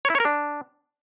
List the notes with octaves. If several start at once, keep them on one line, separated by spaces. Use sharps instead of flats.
C#5
E4
C#5
A#4
D4